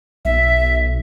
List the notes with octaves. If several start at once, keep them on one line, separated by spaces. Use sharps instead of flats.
B1 E5